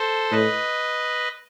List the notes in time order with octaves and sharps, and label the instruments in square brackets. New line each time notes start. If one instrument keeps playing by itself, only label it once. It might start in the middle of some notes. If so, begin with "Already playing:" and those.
Already playing: [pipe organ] A4 C5
[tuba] A2 [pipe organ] B4 D#5